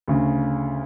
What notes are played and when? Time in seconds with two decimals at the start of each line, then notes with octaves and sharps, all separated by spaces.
0.08 D2 C#3